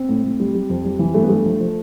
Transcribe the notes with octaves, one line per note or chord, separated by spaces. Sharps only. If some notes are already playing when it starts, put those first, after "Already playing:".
Already playing: C4
A2
A2
G3
G3
F2
G3
E3
G2 A3
B3
G2 A3
F3
F3